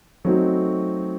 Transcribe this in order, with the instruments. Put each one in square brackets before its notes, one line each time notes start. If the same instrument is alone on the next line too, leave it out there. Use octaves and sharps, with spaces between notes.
[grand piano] F#3 A3 C4 D#4 F#4